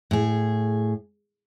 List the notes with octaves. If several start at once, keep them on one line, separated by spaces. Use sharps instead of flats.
A2 G#4